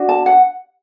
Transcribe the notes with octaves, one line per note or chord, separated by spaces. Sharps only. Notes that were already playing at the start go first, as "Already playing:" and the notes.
Already playing: D4 F#4
A5
F#5